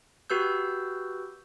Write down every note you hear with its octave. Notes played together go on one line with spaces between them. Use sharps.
F#4 G4 B4 E6 G6